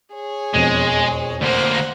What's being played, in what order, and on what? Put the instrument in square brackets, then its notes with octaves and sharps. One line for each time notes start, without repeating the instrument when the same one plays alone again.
[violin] G#4 C#5
[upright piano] E1 F2 [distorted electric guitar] G#3
[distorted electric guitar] D2 A#3 [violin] C5 F#5